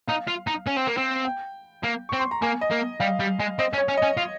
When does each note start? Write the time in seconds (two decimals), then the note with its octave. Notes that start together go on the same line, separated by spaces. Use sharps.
0.07 D#4 F5
0.27 F4
0.47 D#4
0.67 C#4
0.76 C4
0.87 A#3
0.97 C4
1.25 G5
1.83 A#3
2.09 C4 C#6
2.19 C6
2.31 A#5
2.42 A#3 G#5
2.61 D#5
2.71 A#3
3.00 G3 F5
3.20 G3
3.40 G#3
3.59 C4 D#5
3.73 C#4
3.78 C#5
3.88 C#4
3.97 D#5
4.02 C#4
4.17 F4